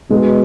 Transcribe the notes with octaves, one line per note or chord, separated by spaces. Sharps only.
B2 G#3